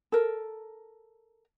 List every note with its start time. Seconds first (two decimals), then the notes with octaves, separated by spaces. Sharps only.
0.12 A4 A#4